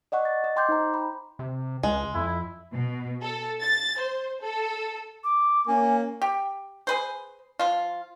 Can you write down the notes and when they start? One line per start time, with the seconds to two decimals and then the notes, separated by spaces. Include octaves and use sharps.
0.12 D5 D#5 F#5 C#6
0.25 A6
0.44 D#5
0.56 G5 C6 D6 G6
0.69 D#4 C5 A#5
0.94 B5
1.39 C3
1.83 C#2 G#3
2.14 F2 E4
2.73 B2
3.22 A4
3.62 A6
4.00 C5
4.42 A4
5.24 D6
5.68 A#3 C#4 G#5
6.22 G4
6.87 G#4 B4 C5
7.59 F3 F4